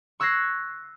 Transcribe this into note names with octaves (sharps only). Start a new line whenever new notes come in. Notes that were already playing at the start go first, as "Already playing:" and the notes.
C#6 E6 F#6 G#6 A#6 C7